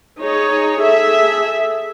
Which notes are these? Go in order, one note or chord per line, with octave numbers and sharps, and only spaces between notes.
D#4 G#4 C#5
G#4 A4 E5